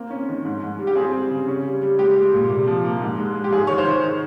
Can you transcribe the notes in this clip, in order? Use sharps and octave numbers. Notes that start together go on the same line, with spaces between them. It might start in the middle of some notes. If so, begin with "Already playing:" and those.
Already playing: A#3 C4
C#4
D#3
G#2
G#2
G3
G4
C4 G#4
G3
C#3
C#4
G3
G3
G#3 G4
G#3
A#2
C3
F3
A#3
G#2
G#3
G#3
G4
G#2 G#4
D#3 C#5
C5
D#3
D#3